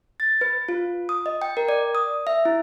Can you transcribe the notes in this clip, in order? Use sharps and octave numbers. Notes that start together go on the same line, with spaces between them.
A6
B4
F4
D#6
D#5
G5
A#4
D5
D#6
E5
E4